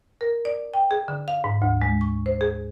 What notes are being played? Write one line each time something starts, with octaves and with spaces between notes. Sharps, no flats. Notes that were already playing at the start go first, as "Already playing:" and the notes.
A#4
D5
G5
G#4
D3
F5
G#2
D2
G#3
C#6
C5
G#4